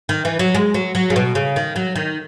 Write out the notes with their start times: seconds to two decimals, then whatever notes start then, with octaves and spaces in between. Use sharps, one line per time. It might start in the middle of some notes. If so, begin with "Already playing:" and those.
0.09 D#3
0.25 E3
0.39 F#3
0.55 G#3
0.74 F#3
0.95 F#3
1.10 C#3
1.16 B2
1.35 C#3
1.56 D#3
1.76 F#3
1.96 D#3